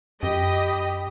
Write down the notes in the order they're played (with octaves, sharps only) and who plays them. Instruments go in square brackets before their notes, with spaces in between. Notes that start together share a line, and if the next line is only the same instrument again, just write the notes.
[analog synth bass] F#2 [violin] G4 B5 [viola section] D#5